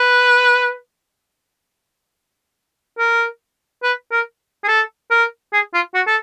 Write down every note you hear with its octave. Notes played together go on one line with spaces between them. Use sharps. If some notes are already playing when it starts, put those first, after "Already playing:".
Already playing: B4
A#4
B4
A#4
G#4
A4
A#4
G#4
F4
F#4
A4